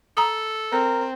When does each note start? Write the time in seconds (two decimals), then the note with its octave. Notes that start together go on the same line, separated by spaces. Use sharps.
0.17 A4 A#5 D#6
0.72 C4 A#4